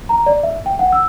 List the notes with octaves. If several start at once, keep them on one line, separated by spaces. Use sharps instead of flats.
A#5
D5
E5
G5
F#5
E6